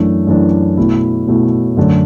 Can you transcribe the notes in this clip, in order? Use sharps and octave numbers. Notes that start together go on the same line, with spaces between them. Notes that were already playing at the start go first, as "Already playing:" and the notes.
Already playing: F#2 E3 A3 D4
F#2 E3 A3 D4
B2 A3 E4
B2 A3 E4
F#2 D3 A3 D4